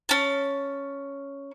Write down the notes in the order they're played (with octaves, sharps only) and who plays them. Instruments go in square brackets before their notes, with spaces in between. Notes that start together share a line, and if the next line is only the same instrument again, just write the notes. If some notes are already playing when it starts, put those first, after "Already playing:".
[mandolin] C#4 A5